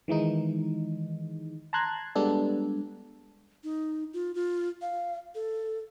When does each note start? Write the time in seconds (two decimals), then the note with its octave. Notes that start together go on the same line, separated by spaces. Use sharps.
0.08 D#3 E3 G#3 D#4
1.73 A5 A#5 C6 F#6 G#6
2.15 G3 G#3 B3 D4 A4
3.64 D#4
4.13 F4
4.35 F4
4.82 F5
5.35 A4